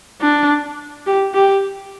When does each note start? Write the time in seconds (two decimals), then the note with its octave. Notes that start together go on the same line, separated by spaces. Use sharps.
0.21 D4
1.07 G4
1.34 G4